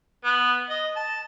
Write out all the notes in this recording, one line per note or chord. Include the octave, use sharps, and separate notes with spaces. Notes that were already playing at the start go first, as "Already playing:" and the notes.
B3
D#5
A5